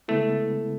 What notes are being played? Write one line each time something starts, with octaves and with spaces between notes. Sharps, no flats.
C#3 G#3 A3 B3 E4